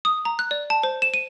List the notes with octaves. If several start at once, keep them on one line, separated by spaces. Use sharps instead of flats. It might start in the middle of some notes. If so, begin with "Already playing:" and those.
D#6
A#5
F#6
D5
A5
C5
E7
D#7